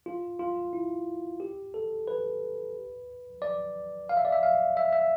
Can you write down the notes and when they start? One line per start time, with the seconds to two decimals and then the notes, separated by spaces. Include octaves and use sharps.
0.06 F4
0.39 F4
0.73 E4
1.40 G4
1.74 A4
2.08 B4
3.42 D5
4.09 F5
4.17 E5
4.25 D5
4.32 E5
4.43 F5
4.77 E5
4.93 E5